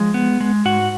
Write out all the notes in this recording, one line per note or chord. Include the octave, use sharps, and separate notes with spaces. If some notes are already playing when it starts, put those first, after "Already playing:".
Already playing: F3 G#3 G#4
B3
G#3
G#2 F#4 F#5